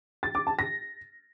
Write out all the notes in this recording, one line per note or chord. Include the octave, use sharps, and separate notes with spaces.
A6
D6
A5
A#6